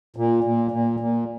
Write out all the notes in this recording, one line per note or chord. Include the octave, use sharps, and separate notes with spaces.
A#2
A#2
A#2
A#2